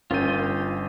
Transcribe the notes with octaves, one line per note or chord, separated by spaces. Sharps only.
G1 C#4 F4 A#4 G5 D#7